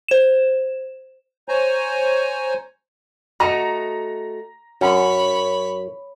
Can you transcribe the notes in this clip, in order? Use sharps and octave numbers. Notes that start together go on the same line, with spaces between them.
C5 E7
C5 C#5 G#5 A#5
A3 F#4 D#5 A#5
F#2 C#4 C#5 B5